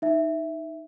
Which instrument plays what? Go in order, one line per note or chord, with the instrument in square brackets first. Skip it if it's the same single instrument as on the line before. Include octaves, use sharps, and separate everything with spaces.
[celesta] D#4 E5